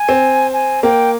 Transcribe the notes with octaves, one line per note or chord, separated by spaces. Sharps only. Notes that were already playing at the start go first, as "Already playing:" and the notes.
Already playing: G#5
C4
G#5
A#3 G5